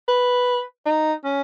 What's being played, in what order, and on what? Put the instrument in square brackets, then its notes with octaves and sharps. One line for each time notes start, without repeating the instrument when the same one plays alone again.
[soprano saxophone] B4
D#4
C#4